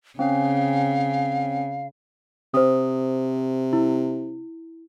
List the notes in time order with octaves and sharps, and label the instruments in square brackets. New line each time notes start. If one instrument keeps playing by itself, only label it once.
[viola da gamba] C#3 [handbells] C4 C#4 [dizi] F5
[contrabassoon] C3 [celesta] C5 D#6
[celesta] E4